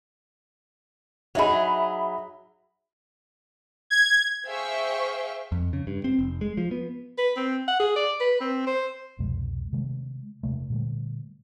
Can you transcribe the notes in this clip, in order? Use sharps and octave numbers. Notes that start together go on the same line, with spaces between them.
F#3 D#4 G#4 E5 B5
G#6
G#4 C5 E5 F5 G5 C#6
F2
C#3
G2
C4
F1
G#3
F3
B3
B4
C4
F#5
G#4
D5
B4
C4
C5
C2 F2 B2 G#3
C3 D#3 G#3 A3
E1 F#2 C3 A3
A#2 D3 G3 A3